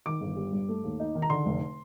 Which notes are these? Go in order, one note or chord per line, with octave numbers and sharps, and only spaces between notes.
D#3 D6
G1
G3
G2
A3
D#2
D#4
D#3
A#5
D3 C6
F1